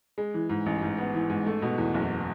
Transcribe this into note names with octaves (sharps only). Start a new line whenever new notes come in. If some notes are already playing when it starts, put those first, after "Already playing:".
G#3
E3
G#2
A1
G#2
B3
E3
G#2
A3
B2
E2
F#1